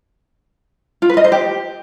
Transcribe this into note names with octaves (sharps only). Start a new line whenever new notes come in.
F4
B4
D#5
C5
G4